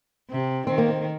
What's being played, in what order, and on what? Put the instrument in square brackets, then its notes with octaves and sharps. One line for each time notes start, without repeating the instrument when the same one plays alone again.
[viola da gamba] C3
[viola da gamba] D#3 [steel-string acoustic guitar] C4
[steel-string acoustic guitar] A#3
C4